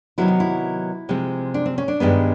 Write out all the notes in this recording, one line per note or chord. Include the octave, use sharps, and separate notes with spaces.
C3 D#3 F#3 B3 E4
D#4
E4
C3 F3 G#3 C4
D4
C4
C#4
D4
G2 D#3 G#3 B3